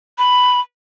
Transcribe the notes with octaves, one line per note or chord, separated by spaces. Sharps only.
B5